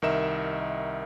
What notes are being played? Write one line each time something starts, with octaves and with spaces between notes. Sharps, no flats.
C2 D#3 A#4 D#5 E5 E7